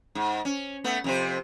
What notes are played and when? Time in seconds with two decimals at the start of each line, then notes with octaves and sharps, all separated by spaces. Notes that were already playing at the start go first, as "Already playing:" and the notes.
0.15 G#2
0.45 C#4
0.84 A3 B3
1.04 F2 C3 C5